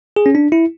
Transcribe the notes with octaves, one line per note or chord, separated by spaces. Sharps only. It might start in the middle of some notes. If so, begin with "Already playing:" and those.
G#4
C#4
D4
E4